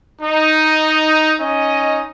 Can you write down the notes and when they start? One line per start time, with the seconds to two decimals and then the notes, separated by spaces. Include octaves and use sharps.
0.21 D#4
1.39 C#4 D#4 D#5